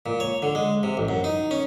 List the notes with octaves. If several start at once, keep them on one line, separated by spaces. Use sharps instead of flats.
A#2
C#5
D3
G#3
C3
A1
F#2
D#4
C#4